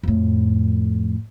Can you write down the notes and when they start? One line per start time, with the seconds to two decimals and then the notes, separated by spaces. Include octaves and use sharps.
0.03 F2 A2